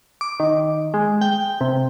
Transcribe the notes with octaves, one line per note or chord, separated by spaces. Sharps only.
D6
D#3
G#3
G5
C3